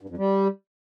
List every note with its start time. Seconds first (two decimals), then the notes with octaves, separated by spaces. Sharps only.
0.01 G2
0.09 F2
0.18 G3